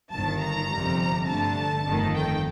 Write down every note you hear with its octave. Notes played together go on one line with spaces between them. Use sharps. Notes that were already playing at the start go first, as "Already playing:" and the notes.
G1 G2 D#3 A5
A#5
G1 F2 C3 G3
G2 D3 A3 A5
G1 F2 D#3 A3
G5